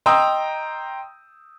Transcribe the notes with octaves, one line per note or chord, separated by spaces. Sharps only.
D#5 G5 A#5 C6 D#6 E6